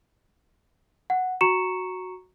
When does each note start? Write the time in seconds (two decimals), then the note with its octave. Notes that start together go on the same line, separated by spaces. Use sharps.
1.10 F#5
1.41 F#4 A#5 C#6 C#7 E7